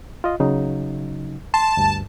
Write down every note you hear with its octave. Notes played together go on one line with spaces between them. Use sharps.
F4 D#5
C#3 F#3 D#4
A5 C6
D2 G2